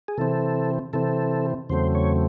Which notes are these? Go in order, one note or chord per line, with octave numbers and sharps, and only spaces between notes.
G#4
C3 E3 C4 A4
C3 E3 C4 A4
E2 C#3 F#3 A3 C4 C5
C#5